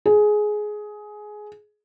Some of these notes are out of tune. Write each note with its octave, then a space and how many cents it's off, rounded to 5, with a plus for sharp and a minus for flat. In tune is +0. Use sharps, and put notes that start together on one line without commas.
G#4 +15